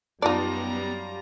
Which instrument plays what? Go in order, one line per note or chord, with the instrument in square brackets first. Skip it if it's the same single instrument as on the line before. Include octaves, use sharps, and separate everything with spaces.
[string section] F#2 G3 A#5 [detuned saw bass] B3 [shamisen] D#4 D5 [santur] F4 A5